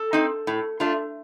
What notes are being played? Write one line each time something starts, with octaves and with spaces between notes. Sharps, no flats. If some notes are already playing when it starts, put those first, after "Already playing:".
Already playing: A4
C4 D#4
A2
A3 D4 F4